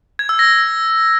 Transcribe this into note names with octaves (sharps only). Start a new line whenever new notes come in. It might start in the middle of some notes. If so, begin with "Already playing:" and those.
G#6
E6
A#6